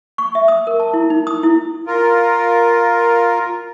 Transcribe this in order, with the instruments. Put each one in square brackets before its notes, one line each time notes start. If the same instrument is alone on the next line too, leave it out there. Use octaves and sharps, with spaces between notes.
[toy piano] C#6
E5
D#6
A#4
A5
E4
D#4
D#6
E4
[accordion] F4 A#4